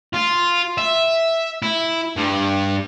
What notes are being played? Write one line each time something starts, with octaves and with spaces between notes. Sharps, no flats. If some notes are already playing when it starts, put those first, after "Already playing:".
F4
E5
E4
G2